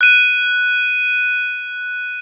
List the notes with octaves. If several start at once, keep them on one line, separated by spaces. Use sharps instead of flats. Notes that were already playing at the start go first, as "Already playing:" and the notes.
F#6 D#7